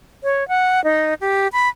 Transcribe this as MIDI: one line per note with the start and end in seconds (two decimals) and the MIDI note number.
0.23 0.47 73
0.48 0.83 78
0.84 1.14 63
1.21 1.48 67
1.53 1.69 83